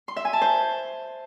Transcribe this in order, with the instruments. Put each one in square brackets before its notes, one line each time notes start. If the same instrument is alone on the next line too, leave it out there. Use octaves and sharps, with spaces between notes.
[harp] C6
E5
G#5
A5
C5